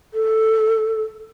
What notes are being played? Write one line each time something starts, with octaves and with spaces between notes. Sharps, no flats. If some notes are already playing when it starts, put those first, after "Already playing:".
A4